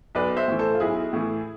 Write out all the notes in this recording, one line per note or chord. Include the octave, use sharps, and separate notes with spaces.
B1 B4 D5
C5 E5
A2 E3
A4 C5
F4
B1 E4 G#4
A2 E3